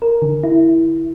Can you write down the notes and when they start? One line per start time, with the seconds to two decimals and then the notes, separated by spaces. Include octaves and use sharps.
0.02 A#4
0.22 D3
0.43 E4